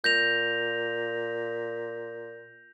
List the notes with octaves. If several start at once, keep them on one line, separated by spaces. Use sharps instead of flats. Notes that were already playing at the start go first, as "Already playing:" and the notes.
A#2 G6 A#6 F7